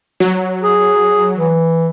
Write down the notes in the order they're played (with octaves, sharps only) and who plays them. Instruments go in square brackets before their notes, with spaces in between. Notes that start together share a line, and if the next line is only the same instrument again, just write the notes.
[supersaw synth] F#3
[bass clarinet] G#4
E3